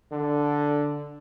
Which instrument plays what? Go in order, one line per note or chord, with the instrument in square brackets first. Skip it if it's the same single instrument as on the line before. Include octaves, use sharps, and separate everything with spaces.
[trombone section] D3